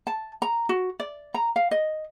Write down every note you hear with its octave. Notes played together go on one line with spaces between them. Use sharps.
A5
A#5
F#4
D5
A#5
F5
D#5